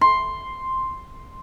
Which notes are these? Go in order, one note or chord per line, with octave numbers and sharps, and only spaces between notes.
C6